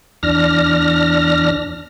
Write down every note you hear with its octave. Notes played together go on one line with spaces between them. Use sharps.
E2 D4 F6 A#6